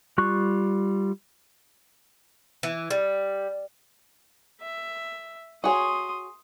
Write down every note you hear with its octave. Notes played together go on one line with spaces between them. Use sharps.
G3 F4 C#6 F#6
E3
G3
E5
F#4 G#4 C#5 C6 D#6